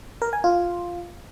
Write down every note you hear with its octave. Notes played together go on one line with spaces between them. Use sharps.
A#4
G#5
F4